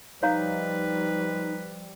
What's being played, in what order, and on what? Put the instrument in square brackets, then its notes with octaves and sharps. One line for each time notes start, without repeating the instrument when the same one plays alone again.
[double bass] F3 G3 [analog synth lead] D#4 [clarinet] B4 [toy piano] C#5 F5 A#5